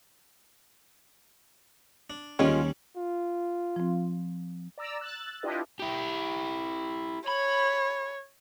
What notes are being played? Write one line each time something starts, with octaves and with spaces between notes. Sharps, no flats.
D4
D#2 D#3 G3 G#3 A#3 C#4 F4
F4
F3 C4
D5 A#5 E6
E6 F#6 A6
D4 E4 F4 G4 B4 D#5
E4 G4
C#5 B5